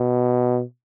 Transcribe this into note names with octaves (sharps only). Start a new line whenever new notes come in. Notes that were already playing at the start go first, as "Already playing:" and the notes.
Already playing: B2